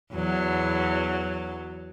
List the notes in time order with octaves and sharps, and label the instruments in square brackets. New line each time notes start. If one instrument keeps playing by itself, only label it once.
[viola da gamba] E2 F#3